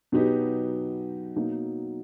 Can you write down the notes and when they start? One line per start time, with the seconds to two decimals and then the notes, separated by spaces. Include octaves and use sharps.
0.12 B2 F#3 B3 D#4 G4
1.36 B2 F#3 A#3 D#4